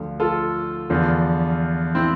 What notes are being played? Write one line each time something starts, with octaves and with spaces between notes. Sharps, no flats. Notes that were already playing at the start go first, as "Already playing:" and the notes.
Already playing: D2 D3 F3
F4 A4
E2 D3 F3
C4 E4